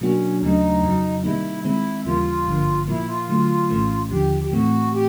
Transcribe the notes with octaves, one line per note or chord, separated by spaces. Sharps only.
B2 F#3 A#3 C#4 D4 F#4
D#2 C#3 F#3 A3 D4 D#4
F2 C#3 F#3
C3 D#3 G3 A#3 D#4 E4
D#3 G#3 C4 E4
D#2 C#3 E3 G3 A#3 F4
G#1 G2 D3 F3 A#3
A#2 F3 A#3 E4
F4
D3 F#3 A3
A#1 A2 E3 A3 C#4
D#2 D3 F3 G4
G4
A2 E3 A3 C4 F#4
G4